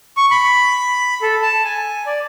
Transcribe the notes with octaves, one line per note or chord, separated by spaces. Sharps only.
C#6
B5
A4
A5
G#5
D5